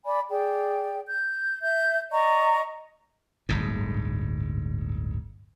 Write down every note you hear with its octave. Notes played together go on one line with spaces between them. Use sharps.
D5 G#5 B5
G#4 D5 G5
G6
E5 G6
D5 D#5 A#5 C#6
D1 G1 G#2